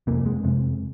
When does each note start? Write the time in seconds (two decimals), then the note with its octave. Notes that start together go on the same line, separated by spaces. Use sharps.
0.07 F2 C3 A#3
0.26 G#3
0.44 F2 C3